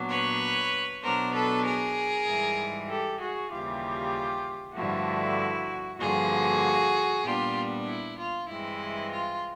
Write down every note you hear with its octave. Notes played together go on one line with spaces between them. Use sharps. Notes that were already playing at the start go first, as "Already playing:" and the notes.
Already playing: A#2 F#3 B3 D4
B4 C#5
B2 F#3 B3 D4 A#4 C5
A4 B4
G#4 A#4
G#2 E3 G3
G4 A4
F#4 G#4
D#2 C#3 E3 G3 F4 G4
G2 D3 F3 A3 E4 F#4
G2 D3 F3 A#3 F#4 G#4
A#2 G3 B3 D4 F4 G4
E4
F4
G2 E3 G#3 C4 E4
F4